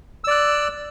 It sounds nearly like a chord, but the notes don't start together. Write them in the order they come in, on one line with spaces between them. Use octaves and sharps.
E6 D5 F#6